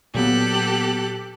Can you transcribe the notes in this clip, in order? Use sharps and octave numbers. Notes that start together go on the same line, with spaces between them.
A#2 F#3 B3 G4 A4 F#6